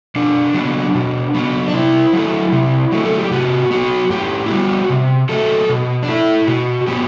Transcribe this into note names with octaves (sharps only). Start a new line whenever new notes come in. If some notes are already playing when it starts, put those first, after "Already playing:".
B2 D4
F#3 B3
B2
F#3 B3
D4
C3 E4
F#3 A3
C3
F#3 A3
A4
G4
C3 F#4
F#3 B3 F#4
A2 G4
E4
G3 B3 F#4
C3
F#3 A3 A4
B2
D4
A3 E4
B2 F#4
F#3 B3 G4